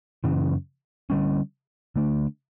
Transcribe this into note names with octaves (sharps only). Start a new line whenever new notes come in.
F#2 C#3 E3
D3 G3 C#4
D3 A3 D4